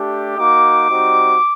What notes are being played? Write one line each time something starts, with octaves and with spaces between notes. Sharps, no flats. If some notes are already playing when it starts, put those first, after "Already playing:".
Already playing: A3 D4 G4
A#3 D#4 F#4 D6
G3 C4 D#4 F#4